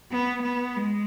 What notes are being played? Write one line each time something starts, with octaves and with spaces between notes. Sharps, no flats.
B3
B3
G#3